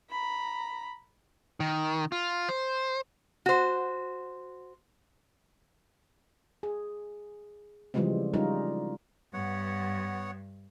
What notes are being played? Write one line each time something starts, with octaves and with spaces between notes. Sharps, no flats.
A#5 B5
D#3
F4
C5
F#4 C5
G#4
C#3 E3 F3 G3 G#3 C4
G3 C#4 D#4 F4 A#4
G2 B3 C#5 F#5